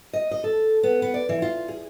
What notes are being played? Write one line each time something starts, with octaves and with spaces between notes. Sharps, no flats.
D#5
D#5
A4
B3
B3
D5
E3
F4
G#4